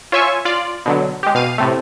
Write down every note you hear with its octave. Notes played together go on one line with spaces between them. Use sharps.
F4 C#5 E5 G#5 C#6
F4 D5
B2 D3 F#3
G#3 G4
B2 F5 D#7
A2 C3 A3